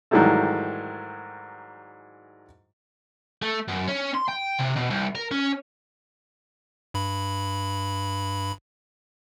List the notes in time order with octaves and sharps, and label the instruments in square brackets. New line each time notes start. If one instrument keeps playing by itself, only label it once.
[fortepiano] G#2 D#3 E3 F#3 G3 A3
[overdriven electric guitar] A3
F#2
C#4
C6
G5
C3
B2
C2
A#4
C#4
[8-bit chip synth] G2 B5